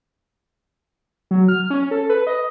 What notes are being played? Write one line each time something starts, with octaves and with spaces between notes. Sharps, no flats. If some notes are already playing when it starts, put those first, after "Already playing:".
F#3
F6
C#4
A4
B4
D#5